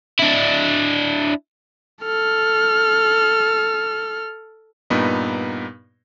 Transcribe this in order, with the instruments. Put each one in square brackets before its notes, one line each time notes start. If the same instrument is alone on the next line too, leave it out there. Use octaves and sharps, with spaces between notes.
[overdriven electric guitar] D4 E4
[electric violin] A4 F6
[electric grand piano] G2 A#2 B3 D#4